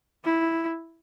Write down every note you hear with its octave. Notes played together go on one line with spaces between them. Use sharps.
E4